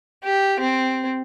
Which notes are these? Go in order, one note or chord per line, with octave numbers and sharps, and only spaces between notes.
G4
C4